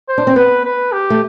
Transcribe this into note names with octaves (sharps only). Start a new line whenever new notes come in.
C5
D4
C4
B3 B4
B4
G4
A3